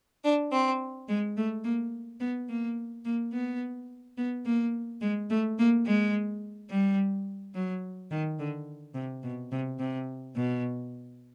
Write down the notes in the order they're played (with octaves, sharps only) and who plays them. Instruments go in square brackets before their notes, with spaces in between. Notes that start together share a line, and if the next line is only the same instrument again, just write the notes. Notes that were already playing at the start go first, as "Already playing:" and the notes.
[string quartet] D4
C4
G#3
A3
A#3
B3
A#3
A#3
B3
B3
A#3
G#3
A3
A#3
G#3
G3
F#3
D#3
D3
C3
B2
C3
C3
B2